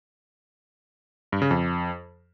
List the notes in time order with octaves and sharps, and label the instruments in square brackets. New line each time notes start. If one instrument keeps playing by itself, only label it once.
[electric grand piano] G2
C#3
F2